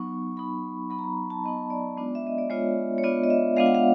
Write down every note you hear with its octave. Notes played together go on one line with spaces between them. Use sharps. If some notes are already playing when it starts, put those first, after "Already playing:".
Already playing: F#3 B3 D#4 C#6
F#3 B3 D#4 B5
F#3 B3 D#4 B5
A#5
B5
A#5
A5
F#3 B3 D#4 D#5
D5
G#3 B3 D4 F4
E5
D#5
D5
G#3 B3 D4 F4 C#5
C#5
G#3 B3 D4 F4 D5
D#5
E5
G#3 B3 D4 F4 F5
F#5
F5